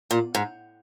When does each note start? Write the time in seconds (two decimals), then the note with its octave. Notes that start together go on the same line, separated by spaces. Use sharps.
0.11 A#2
0.35 G#2